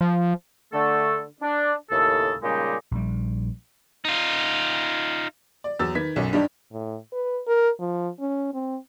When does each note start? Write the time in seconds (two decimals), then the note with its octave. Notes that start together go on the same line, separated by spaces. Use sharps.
0.01 F3
0.73 D3 A3 A4
1.41 D4
1.91 D#2 A2 C#3 A4
2.43 A#2 C#3 G3 G#3 D#4 G4
2.91 A#1 G3
4.05 D#4 F4
5.64 D5
5.79 E2 F#3 E6 A6
5.95 D#3 B4 G#6 B6
6.16 B1 F#2
6.33 G2 G3 D4 D#4 G4
6.73 A2
7.13 B4
7.47 A#4
7.79 F3
8.20 C#4
8.54 C4